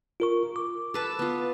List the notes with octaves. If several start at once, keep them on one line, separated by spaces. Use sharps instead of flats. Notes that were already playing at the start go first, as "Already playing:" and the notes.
F4 A#4 C#6
D6
A4 B4 A5
B3 F4